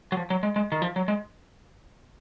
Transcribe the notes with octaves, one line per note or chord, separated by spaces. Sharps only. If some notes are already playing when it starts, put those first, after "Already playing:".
F#3
F3
F#3
G#3
G#3
D#3
F3
F#3
G#3